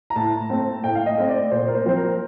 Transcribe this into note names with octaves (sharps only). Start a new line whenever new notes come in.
A#5
A2 A5
A3 C4
A2 G5
F5
D#5
A3 C4
D5
A#2 C5
A#4
C5
F3 C4 C5
A#4